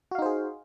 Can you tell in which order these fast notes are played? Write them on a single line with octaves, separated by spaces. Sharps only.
F#4 F5 D#4 C5 G#4